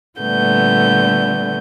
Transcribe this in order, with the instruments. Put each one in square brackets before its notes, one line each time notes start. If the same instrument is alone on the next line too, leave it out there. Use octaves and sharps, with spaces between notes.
[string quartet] A#2 D3 G3 A3 B3 G6